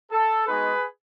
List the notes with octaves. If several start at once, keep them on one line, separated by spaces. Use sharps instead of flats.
A4
G#3 B3 D#4 F#4 G#4 B4